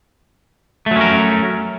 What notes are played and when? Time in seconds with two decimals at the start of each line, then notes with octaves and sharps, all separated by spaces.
0.86 A3
0.91 F#3
0.96 C#4
1.01 A#4